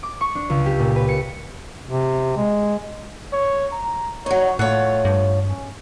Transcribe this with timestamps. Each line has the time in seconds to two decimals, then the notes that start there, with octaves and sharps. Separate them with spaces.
0.03 D6
0.21 C#6
0.35 D4
0.50 C#2
0.66 G4
0.79 A#2
0.96 B4
1.09 C#7
1.87 C3
2.37 G#3
3.33 C#5
3.72 A#5
4.26 F#3 D#4 C#5
4.59 A2 A3 F4 C#5 F#5
5.05 G2
5.48 C#4